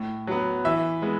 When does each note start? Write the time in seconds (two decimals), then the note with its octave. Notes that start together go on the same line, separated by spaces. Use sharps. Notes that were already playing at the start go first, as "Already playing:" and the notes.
Already playing: A2
0.27 F#3 B3
0.65 E3 E5
1.02 G#3 B3